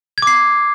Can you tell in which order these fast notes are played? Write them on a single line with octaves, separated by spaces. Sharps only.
G#6 D6 C7